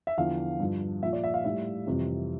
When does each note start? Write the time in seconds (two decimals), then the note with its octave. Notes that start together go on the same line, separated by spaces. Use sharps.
0.07 E5
0.17 E2 D3 F3 F5
0.60 G2 F3
1.02 A#2 E5
1.06 F3
1.13 D5
1.24 E5
1.34 F5
1.45 A2 G3 E5
1.87 F2 C3 E3 G3